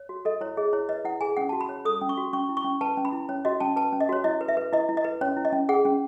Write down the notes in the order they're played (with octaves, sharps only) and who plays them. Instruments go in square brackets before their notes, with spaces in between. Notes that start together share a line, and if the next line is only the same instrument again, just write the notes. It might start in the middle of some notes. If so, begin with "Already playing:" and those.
Already playing: [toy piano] C#5
F#4
A4 D#5
E4 C#5
G#4 D#5
E4 C#5
B4 D#5
E4 F#5
G#4 G#5
C#4 F#5
F#4 A5
B5
C#5
A4 D#6
C#4
C#6
F#4
C#4 C#6
E4
C#6
C#4
B4 A5
C#4
B5
E4
C#4 C#5
F#4 D#5
C#4 A5
B4 A5
C#4
D#5
F#4 C#5
E4 D#5
B4
E5
B4
E4 D#5
E4
D#5
B4
C#4 C#5
E4
D#5
C#4
G#4 F#5
C#4